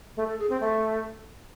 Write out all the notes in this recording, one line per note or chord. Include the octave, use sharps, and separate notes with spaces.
A3
A4
G#4
C4
A3